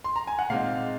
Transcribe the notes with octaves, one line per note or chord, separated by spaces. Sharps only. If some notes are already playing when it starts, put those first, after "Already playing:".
C6
A#5
G#5
F#5
A#2 G#3 C4 D#4 F5